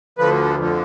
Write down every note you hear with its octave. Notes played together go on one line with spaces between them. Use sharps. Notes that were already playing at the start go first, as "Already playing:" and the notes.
D2 D3 F3 B4
F2 D3 F3